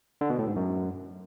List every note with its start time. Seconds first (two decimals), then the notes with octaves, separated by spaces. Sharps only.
0.21 D3
0.30 B2
0.39 A2
0.47 G#2
0.56 F#2